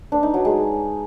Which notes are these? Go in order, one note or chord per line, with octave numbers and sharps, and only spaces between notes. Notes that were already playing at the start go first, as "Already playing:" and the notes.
D4
D#4
F#3
G#3